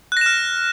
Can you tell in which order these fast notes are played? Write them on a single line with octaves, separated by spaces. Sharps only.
F#6 A#6 E7 F6